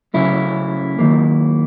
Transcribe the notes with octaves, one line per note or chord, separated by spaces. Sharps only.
C#3 F#3 A3 C#4 E4
D#2 D#3 F#3 A#3